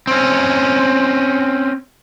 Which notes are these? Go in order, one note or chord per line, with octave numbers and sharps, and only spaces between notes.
C4 C#4